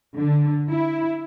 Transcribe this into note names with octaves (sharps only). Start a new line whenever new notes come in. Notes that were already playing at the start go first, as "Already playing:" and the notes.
D3
E4